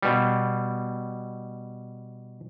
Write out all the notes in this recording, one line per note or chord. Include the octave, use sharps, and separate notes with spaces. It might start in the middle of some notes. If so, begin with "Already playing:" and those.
B2 G3